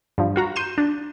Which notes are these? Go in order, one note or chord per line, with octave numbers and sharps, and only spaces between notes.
G2 F3
F4 F#4 A#5
C6 G6 D#7 E7
D4